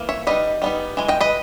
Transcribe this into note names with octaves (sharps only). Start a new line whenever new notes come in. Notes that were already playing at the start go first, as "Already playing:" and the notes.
Already playing: E3 A#3
C#5 E5
G3 B3 D#4 B4 D#5
G3 B3 D#4
E3 G#3
D#5 G5
B4 D#5